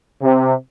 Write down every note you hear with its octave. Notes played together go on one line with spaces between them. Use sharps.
C3